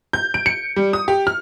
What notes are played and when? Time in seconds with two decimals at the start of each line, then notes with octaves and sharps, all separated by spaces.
0.13 G6
0.34 D7
0.46 C#7
0.76 G3
0.93 D#6
1.08 G4
1.27 F6